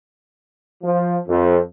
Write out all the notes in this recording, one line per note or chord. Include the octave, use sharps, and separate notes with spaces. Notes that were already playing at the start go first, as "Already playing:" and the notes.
F3
F2